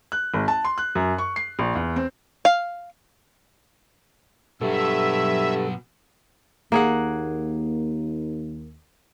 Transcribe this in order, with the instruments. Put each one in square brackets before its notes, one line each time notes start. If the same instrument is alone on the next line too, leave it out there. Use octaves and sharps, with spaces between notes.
[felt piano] F#6
G#1
A5
C6
F#6
F#2
C#6
C7
A#1
E2
C4
[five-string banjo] F5
[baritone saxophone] G2 [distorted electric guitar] B2 F#3 [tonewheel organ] A4 [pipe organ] E5
[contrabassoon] D#2 [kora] A#3 G#4 F#5